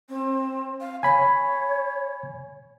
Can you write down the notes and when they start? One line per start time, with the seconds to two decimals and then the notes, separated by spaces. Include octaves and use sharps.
0.09 C4
0.81 F5
1.03 C#5 G#5 B5